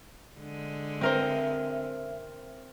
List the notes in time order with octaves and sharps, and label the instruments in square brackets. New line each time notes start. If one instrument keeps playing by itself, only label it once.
[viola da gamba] D3 G#3
[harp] C4 A#4 C5 [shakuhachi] E5